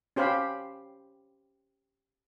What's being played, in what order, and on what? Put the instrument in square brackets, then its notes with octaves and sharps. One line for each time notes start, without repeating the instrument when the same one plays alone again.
[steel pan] C#4 G4 C5 F5 B5